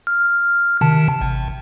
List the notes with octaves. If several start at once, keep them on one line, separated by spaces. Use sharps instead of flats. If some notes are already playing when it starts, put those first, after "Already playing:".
F6
C3 D#3 A5
G#1